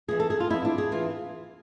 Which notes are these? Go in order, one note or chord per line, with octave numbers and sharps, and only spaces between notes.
F2 E3 G#4
A4
G#4
F4
F2 E3 E4
D4
G#4
E3 F4